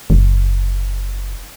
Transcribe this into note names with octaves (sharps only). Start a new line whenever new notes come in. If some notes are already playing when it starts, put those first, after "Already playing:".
F#1